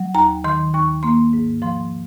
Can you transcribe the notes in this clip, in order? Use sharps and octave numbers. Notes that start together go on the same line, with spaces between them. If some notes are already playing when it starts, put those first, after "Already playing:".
Already playing: F#3
D#2 A#5
D#3 C6
D#2 C#6
A#3 C6
G#2
F3 C6